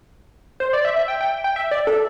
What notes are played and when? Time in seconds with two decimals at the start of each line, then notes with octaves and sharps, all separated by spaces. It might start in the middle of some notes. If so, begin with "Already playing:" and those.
0.60 C5
0.73 D5
0.85 E5
0.96 E5
1.08 G5
1.21 G5
1.44 G5
1.56 E5
1.71 D5
1.87 A4